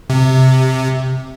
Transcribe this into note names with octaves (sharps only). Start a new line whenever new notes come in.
C3